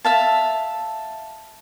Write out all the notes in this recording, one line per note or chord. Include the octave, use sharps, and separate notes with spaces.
E5 F5 A5